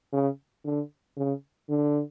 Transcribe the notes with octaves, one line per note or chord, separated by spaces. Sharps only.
C#3
D3
C#3
D3